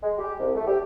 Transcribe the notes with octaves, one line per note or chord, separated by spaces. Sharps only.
G#3
G4
C2
A3
G4